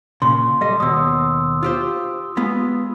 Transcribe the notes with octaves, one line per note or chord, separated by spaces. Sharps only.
A#2 C#3 C6
G3 A4 D#5
D#2 B2 D#6 E6
F4 G4 C5
G#3 B3 F4